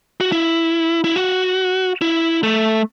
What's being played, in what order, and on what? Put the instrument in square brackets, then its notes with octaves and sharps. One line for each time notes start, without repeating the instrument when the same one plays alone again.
[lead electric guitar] F#4
E4
E4
F#4
E4
A3